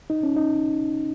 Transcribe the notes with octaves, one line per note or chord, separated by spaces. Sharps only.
D#4
C#4
D#4